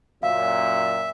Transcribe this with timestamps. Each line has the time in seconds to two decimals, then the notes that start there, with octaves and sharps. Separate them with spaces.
0.23 F#2 A#2 E5 F5